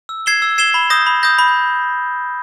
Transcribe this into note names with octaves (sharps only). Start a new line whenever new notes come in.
E6
G#6 C7 E7 G7
E6
G#6 C7 E7 G7
B5
D#6 G6 A#6
B5
D#6 G6 A#6
B5